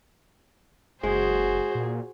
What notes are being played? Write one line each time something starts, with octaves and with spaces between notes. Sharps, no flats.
F#1 G#3 F#4 G#4 C5
A#2